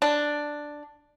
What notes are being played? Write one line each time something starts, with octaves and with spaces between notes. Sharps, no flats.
D4